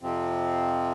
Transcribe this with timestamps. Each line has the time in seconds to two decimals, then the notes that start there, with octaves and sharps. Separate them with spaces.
0.01 F2 C3 F3 C4